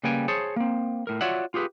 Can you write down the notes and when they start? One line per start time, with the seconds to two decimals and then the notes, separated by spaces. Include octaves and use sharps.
0.04 C#3 G3 A#3 B4 G5 G#5
0.28 G#4 C5 C#5 A5
0.56 A#3 C4
1.07 A2 A#4
1.21 F4 F#4 C#5 D5 E5 F#5
1.54 F4 G4 G#4 B4